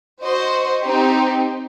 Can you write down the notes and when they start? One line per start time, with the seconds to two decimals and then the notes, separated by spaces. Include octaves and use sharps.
0.22 F#4 C5 D#5
0.83 C4 D#4 G4